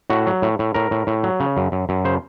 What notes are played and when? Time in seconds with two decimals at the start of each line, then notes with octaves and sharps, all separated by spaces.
0.10 A2 F#4
0.27 F#3
0.42 A2
0.59 A2
0.74 A2 A#4
0.91 A2
1.07 A2
1.24 F#3
1.40 C#3
1.57 F#2
1.72 F#2
1.89 F#2
2.05 C#3 C5